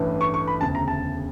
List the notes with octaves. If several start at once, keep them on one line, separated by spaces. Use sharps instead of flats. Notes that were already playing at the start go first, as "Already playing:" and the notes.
Already playing: A1 G2 E3 A3
C#6
C#6
B5
E1 D2 C#3 A5
A#5
A5